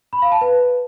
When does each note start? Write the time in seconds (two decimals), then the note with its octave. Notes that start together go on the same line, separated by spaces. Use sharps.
0.13 B5
0.22 F5
0.32 A5
0.41 B4